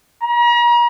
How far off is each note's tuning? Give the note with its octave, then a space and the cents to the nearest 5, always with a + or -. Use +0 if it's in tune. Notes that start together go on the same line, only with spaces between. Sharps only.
A#5 +40